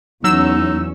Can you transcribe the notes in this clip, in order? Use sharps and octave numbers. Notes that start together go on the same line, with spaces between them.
E2 F#3 C#4 D#4 E6